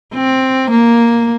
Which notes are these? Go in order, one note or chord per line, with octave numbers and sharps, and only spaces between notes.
C4
A#3